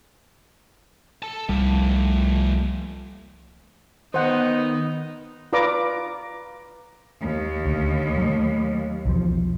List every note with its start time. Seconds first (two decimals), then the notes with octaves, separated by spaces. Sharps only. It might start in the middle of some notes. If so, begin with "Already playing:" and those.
1.23 A4 A5
1.49 C2 F3 G3 A3
4.14 D#3 B3 D#4 C5 F#5
5.53 F4 B4 D5 A#5 D6
7.21 D#2
7.66 D2
8.18 F#3 A3
9.05 B1 E2 F3